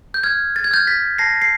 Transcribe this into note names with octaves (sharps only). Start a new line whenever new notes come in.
G6
F6 G#6
A6
G#6
F6 G6 A6
A6 B6
A5 A#6 C7
C7